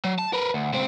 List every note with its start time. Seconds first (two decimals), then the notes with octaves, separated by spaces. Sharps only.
0.04 F#3
0.19 A5
0.33 A#4 B4
0.54 D2
0.73 C#2 C4